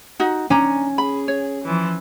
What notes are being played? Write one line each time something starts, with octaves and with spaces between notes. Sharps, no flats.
D#4 F#4
C#4 D4 A#5
G#4 B5
C#5
E3 F3